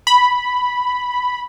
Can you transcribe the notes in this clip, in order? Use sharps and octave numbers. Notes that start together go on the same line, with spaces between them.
B5